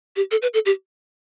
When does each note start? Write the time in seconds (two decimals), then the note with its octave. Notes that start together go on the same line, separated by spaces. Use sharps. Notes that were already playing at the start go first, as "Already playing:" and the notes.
0.16 G4
0.31 A4
0.42 B4
0.54 A4
0.66 G4